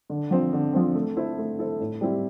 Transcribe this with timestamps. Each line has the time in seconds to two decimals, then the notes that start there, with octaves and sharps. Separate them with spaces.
0.10 D3
0.31 F3 C4
0.53 D3
0.74 F3 C4
0.95 A3
1.17 E4 A4 C5
1.38 A3
1.58 E4 A4 C5
1.80 A2
2.01 G3 C4 E4 G4